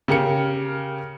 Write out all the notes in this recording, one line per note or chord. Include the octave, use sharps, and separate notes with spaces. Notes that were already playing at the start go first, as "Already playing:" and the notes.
C#3 G4 A#4 C#7